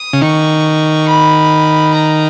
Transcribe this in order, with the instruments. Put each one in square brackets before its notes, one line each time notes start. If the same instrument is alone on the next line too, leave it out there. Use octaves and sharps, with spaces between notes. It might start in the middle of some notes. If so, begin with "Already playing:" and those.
Already playing: [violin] D#6
[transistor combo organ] C#3
[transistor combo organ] D#3 [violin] C#6
[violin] B5
A#5